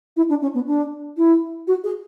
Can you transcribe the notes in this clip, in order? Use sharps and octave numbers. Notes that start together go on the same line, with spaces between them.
E4
D4
C#4
B3
D4
E4
F#4
G#4